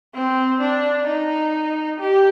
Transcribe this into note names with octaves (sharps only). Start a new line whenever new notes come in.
C4
D4
D#4
G4